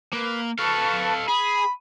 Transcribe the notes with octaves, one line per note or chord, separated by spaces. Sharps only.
A#3 B4
A4 B4 F5 A5 C#6
G#4 B5 D#6